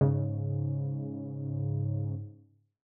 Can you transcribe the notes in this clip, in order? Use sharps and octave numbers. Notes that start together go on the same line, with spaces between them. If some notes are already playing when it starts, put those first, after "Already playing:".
G#2 C#3